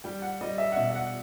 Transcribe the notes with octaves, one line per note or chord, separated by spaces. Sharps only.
G3 G5
F#5
G3 D#5
E5
F#5
B2 E5
E5
F#5